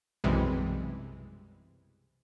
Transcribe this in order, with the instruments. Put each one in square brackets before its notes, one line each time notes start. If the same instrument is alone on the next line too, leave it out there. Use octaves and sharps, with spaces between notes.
[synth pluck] B1 F#2 C3 E3 G3 G#3